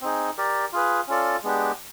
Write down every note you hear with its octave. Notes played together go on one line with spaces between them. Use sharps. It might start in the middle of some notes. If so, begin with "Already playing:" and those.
C4 D#4 G#4
G4 A#4 D5
F4 G#4 B4
C#4 F4 A4 D5
G#3 B3 D4 G4